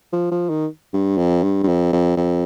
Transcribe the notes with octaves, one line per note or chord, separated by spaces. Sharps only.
F3
F3
D#3
G2
F2
G2
G2
F2
F2
F2